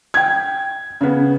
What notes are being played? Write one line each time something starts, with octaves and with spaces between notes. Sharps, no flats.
G5 G#6
C#3 B3